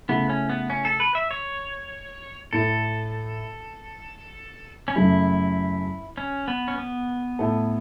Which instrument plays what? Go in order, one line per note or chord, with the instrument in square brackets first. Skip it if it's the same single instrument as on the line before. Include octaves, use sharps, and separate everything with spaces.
[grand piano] C#3 A3 E4 [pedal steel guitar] B3
[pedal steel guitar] C#4
B3
C#4
A4
B4
E5
C#5
[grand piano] A2 A3 E4 [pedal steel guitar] A4
[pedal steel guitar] C#4
[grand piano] F#2 C#3 F#3 A3 [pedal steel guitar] E4
[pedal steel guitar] C#4
B3
C#4
B3
[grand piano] A2 A3 E4 A4